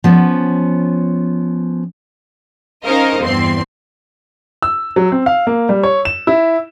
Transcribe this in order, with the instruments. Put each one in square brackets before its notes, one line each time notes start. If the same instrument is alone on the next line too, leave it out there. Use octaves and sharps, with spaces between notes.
[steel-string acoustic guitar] F3 B3 C#4
[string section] C#4 D#4 A#4 C5 D#5 F5
E2 G2 C4 C6
[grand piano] E6
F#3
C4
F5
A#3
G3
C#5
E7
E4